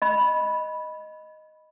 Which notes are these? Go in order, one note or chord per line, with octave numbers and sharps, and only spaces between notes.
D#5 B5